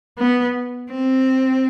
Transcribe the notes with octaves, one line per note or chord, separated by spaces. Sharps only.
B3
C4